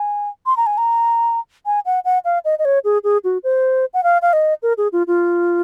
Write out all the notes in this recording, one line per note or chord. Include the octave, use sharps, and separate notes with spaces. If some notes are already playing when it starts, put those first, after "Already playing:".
Already playing: G#5
C6
A#5
G#5
A#5
G#5
F#5
F#5
F5
D#5
D#5
C#5
G#4
G#4
F#4
C5
F#5
F5
F5
D#5
A#4
G#4
F4
F4